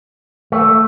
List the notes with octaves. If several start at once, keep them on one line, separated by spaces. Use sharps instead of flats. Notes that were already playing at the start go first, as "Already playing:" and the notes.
A3